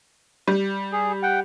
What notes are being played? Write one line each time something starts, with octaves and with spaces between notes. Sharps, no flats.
G3
G#4
F#5 G5